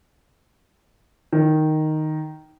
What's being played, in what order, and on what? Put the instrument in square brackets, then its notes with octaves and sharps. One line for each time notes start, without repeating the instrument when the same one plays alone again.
[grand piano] D#3